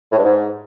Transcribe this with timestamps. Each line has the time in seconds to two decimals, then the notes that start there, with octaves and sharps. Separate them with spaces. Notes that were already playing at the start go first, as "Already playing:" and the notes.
0.12 A2
0.18 G2
0.24 G#2